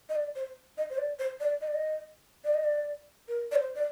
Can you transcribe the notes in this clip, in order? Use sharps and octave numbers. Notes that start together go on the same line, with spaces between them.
D#5
D5
C5
D#5
C5
D5
C5
D5
D#5
D5
D#5
D5
D#5
D5
A#4
D5
C5
D5